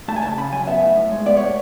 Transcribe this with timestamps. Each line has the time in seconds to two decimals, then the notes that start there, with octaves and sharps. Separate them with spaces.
0.08 A3 A5
0.16 G#5
0.22 C#3 A5
0.38 C#3 B5
0.52 F#3 G#5
0.67 B3 E5
0.82 A2
0.97 A2
1.12 G#3
1.26 B3 D5
1.37 A2 C#5